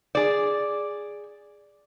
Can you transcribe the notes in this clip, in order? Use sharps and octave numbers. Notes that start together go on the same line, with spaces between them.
G#4 D5